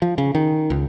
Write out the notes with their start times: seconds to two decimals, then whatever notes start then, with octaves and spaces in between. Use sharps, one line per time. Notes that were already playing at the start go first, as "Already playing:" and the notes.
0.02 F3
0.18 C#3
0.35 D#3
0.70 C#2